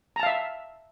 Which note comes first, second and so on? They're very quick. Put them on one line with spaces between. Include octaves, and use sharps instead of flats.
A#5 A5 F5 E5